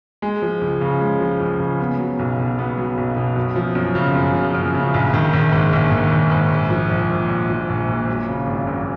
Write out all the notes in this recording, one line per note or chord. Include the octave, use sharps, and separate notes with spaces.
G#3
F3
C#2
C#3
G#3
F3
C#2
C#3
B3
F#3
B1
B2
B3
F#3
B1
B2
F#2
F3
F#2
C#3
F#2
F3
F#2
C#3
A#1
D#3
A#1
G#2
A#1
D#3
A#1
G#2
A#1
F3
A#1
A#2
A#1
F3
A#1
A#2
F#3
C#3
G#1
F#2